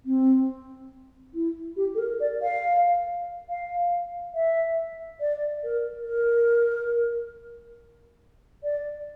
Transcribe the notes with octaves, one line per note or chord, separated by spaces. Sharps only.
C4
E4
G4
A4
A#4
D5
F5
F5
E5
D5
A#4
A#4
D5